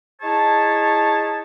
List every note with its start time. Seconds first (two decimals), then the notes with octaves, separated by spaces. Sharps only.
0.22 D#4 E4 G#4 C#5 A5